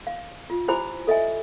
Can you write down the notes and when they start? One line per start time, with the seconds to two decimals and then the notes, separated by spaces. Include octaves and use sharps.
0.07 F5
0.50 F4
0.68 E4 G4 C5 G#5 B5 D6
1.07 A4 D#5 E5 G#5